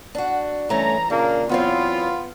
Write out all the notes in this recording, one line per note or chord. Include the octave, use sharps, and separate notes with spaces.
D4 F#4
G2 E3 A3 C#4 A#5
A#2 C#3 A#3 D4
E2 F#3 B3 C4 F4